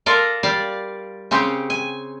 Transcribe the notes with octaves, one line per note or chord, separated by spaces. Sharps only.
F4 A4 A#4 D5
G3 D5 F5
C#3 C4 C#4 G4
G#5